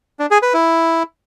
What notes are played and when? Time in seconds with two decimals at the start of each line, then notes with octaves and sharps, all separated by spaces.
0.19 D4
0.31 G#4
0.42 B4
0.54 E4